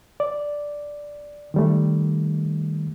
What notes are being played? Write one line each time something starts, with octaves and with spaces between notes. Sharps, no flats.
D5
D#3 G3 A3